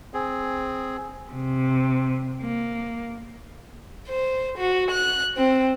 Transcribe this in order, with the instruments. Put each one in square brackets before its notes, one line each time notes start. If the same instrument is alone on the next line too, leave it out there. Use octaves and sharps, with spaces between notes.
[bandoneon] C4 G#4
[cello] C3
A#3
[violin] C5
F#4
F#6
C4